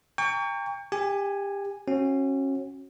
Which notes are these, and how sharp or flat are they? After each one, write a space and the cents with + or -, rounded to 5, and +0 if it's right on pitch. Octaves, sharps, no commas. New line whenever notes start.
G5 +35 A#5 -40 C#6 +25
G4 +25 G#5 +0
C#4 -30 F#4 +0